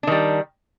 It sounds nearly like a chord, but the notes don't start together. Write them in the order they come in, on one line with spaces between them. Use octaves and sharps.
D4 D#3 G3